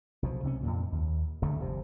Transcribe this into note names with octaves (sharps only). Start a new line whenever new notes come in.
B1 B2 F3
C#2 C3 C4 C#4
F2 A#2
D#2
D#1 D2 D3 A3
G1 C3 F3